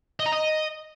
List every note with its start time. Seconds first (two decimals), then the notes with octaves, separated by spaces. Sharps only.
0.20 D#5
0.26 A#5
0.32 D#5